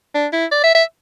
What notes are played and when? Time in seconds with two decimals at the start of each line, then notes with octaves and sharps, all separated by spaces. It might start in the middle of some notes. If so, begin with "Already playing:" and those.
0.14 D4
0.33 E4
0.52 D5
0.64 E5
0.75 E5